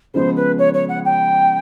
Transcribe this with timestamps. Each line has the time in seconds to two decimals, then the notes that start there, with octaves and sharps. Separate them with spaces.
0.14 C#3 F3 G#3 B3 C5
0.36 B4
0.59 C#5
0.74 C#5
0.89 F#5
1.05 G5